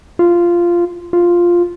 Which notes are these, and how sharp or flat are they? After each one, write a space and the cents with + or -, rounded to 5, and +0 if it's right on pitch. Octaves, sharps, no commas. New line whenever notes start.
F4 -10
F4 +0